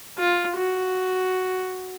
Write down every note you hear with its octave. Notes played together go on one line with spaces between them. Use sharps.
F4
F#4